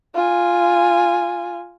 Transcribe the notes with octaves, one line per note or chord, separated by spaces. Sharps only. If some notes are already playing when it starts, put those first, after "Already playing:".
F4 G#5